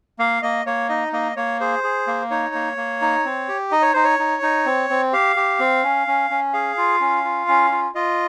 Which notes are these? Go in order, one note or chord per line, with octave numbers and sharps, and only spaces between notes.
A#3 F5
A#3 D#5
A#3 C#5
D#4 D#5
A#3 D#5
A#3 C#5
G#4 C5
G#4
A#3
D#4 C#5
A#3
A#3
D#4
C4
G4
D#4 D#5
C#5
D#4 C5
C#5
D#4
D#4
C4
C4
G4 F5
G4
C4
C#4
C#4
C#4
G#4 F5
F4
C#4
F4
C#4
F4
F4 D#5